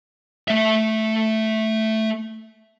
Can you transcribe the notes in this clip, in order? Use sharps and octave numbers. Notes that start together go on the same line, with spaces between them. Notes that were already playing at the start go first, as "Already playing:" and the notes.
A3 E5